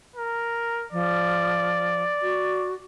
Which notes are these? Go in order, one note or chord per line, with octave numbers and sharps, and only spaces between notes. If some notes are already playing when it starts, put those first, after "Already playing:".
A#4
F3 D5
F#4